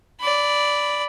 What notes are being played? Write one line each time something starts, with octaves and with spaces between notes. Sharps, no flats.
D5 B5